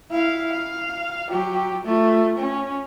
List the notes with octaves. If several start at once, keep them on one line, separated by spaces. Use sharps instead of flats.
E4 F5
F5
F#3 G4
A3 F4
C#4